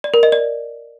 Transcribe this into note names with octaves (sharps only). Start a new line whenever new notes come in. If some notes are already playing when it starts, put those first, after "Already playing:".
D5
A#4
D#5
D5